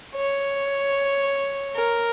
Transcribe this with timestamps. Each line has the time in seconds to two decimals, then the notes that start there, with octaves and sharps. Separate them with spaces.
0.15 C#5
1.76 A#4